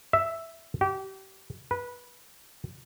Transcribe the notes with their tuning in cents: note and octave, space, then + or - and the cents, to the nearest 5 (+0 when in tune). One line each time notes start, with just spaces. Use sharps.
E5 +0
G4 -30
B4 -20